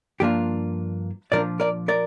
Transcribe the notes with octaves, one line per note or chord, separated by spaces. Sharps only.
G2 F3 A#3 D4 F4 G4
A#2 F3 D4 F4 A#4 D5
A#4 D5
A#4 D5